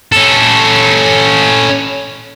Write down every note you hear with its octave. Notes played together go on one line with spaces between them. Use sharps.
C#4 A4